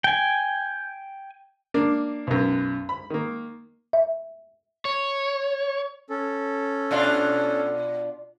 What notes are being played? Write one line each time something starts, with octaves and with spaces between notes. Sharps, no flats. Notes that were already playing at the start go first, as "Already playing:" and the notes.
G5 G#5
A#3 D4
B1 F#2
B5
D#3 A#3
E5
C#5
C#4 A4
B2 D4 F4